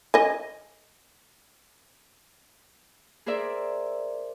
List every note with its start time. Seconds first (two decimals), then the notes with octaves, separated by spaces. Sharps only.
0.14 D#5 G#5
3.26 G#4 A#4 C5 D5 E5